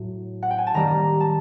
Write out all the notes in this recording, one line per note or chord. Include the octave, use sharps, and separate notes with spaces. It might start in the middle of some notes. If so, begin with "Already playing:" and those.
Already playing: A2 F#3
F#5
G5
G#5
A5
D#3 G3 A#3 A#5
A5